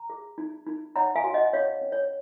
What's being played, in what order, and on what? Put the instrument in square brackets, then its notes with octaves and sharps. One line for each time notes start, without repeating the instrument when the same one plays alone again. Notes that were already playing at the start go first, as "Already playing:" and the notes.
Already playing: [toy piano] A#5
G#4
D#4
D#4
C#5 F#5 A#5
F5 G#5
F#4
D#5 F#5
C#4 C#5 F5
C#4
C#5